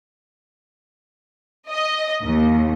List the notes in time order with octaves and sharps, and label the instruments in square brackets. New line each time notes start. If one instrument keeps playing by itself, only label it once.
[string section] D#5
D#2